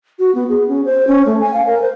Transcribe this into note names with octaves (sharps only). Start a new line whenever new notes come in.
F#4
B3
G#4
C#4
C5
C#4
A3
G#5
F5
A#4
C5